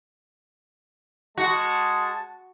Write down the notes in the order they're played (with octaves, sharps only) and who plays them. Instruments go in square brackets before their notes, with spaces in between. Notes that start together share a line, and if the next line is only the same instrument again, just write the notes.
[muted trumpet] G#3 [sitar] F#4 [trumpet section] A5